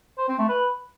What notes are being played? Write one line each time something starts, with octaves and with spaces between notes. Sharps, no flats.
C5
C4
A3
B4